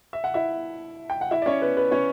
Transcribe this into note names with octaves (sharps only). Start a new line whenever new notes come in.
E5
F#5
E4 E5
G5
F#5
E4 E5
D5
C#4 C#5
B3 B4
B3 B4
C#4 C#5